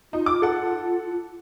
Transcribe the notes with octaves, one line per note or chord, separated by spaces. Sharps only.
D#4 F4
D6
A4 F#5